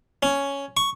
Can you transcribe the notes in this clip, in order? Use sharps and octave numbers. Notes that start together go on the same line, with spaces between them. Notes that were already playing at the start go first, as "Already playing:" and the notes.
C#4
C#6